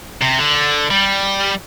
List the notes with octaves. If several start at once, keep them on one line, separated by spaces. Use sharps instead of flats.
C3
D3
G3